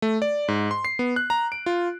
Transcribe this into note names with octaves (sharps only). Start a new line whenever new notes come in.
A3
D5
G#2
C6
C7
B3
F#6
A#5
D7
F4